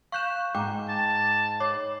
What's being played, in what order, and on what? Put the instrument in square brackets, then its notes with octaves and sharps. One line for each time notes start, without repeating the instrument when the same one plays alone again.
[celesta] F5 F#6 [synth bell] C#6 G6 E7
[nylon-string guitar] G#2 [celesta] G5 A#5 [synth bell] D6
[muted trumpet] A5
[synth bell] C#5 [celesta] D6